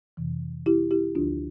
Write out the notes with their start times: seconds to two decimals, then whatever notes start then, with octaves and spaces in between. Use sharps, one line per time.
0.17 F2 C3 E3
0.66 E4 G4
0.91 E4 G4
1.15 D2 D3 F3 D4 F4